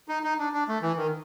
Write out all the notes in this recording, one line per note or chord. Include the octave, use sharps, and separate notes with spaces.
D#4
D#4
D4
D4
A3
E3
D#3